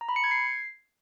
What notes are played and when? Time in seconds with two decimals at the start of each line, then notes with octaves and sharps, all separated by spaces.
0.01 A#5
0.09 B5
0.16 C#7
0.24 G#6
0.31 C7